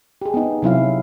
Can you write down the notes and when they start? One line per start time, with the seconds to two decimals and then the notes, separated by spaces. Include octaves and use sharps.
0.22 G4 G#4
0.34 B3 D#4
0.62 C3 F#3 E4 F5